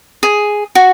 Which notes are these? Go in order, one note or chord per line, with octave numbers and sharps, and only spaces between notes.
G#4
F#4